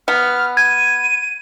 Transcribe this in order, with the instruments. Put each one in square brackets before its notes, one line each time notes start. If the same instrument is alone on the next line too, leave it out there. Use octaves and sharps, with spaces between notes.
[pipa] B3 [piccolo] F6
[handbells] G#6 [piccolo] D#7